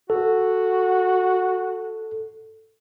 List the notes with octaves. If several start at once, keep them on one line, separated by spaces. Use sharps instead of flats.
F#4 A4